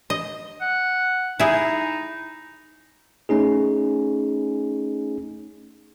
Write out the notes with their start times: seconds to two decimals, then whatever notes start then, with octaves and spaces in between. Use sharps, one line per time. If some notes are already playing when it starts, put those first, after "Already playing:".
0.10 D#5
0.61 F#5
1.40 D#4 E4 G#4
3.29 A3 C#4 D#4 G#4